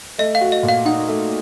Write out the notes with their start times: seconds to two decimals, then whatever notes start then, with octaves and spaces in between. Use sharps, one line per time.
0.18 A3 D#5
0.35 F5
0.41 F#4
0.52 D#5
0.63 A#2
0.68 F5
0.85 D#4 F#5
1.08 A3